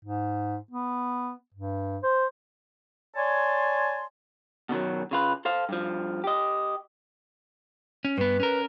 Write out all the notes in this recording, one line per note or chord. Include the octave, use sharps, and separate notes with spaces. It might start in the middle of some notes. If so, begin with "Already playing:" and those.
G#2
B3
G2
C5
C#5 D5 G#5 A5 C6
B2 D3 D#3 F#3
C#3 F4 B4
A4 C5 F5
G2 F3
G4 D#5
C#4
G2 B3 B4
C#4 A#4